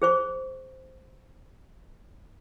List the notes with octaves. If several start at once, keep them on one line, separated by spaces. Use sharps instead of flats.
G#4 C5 C#6